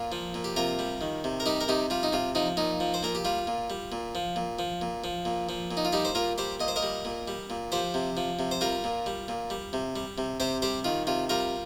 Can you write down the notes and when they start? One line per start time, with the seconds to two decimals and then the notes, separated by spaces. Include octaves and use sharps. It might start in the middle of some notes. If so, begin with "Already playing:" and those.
Already playing: A#2 F4
0.12 F3
0.34 A#2
0.44 G4
0.56 C3 F4 A#4
0.79 G3
1.01 D#3
1.24 C3
1.40 A#4
1.46 G3 D#4 G4
1.61 A#4
1.68 C3 D#4 G4
1.90 G3 F4
2.03 D#4
2.13 C3 F4
2.35 F3 D#4
2.57 A#2 D#4
2.80 F3
2.94 C5
3.03 A#2 A#4
3.15 G4
3.25 G3 F4
3.47 A#2
3.70 G3
3.92 A#2
4.15 F3
4.36 A#2
4.59 F3
4.81 A#2
5.04 F3
5.25 A#2
5.49 F3
5.71 A#2
5.77 D#4
5.85 F4
5.92 G3 D#4 G4
6.05 C5
6.15 A#2 F4 A#4
6.38 G3 G4 C5
6.60 A#2 D#5
6.68 C5
6.76 A#4 D#5
6.83 G3
7.05 A#2
7.28 G3
7.50 A#2
7.72 F3 G4 C5
7.94 C3
8.17 F3
8.39 C3
8.51 C5
8.61 G3 F4 A#4
8.84 A#2
9.06 G3
9.28 A#2
9.50 G3
9.73 C3
9.96 G3
10.18 C3
10.40 C3 G4 C5
10.62 G3 G4 C5
10.84 D#3 F4
11.07 C3 F4
11.29 G3 F4 A#4